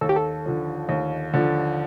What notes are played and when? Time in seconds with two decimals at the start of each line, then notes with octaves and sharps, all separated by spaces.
0.01 D#2 A4
0.09 G4
0.16 A4
0.46 D3 F3
0.89 D#2
1.34 D3 F3